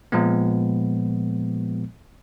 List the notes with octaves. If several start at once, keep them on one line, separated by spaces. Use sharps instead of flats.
A#2 F3 G#3 B3